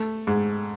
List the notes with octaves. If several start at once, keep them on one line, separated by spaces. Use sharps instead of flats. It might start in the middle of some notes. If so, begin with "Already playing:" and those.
Already playing: A3
G#2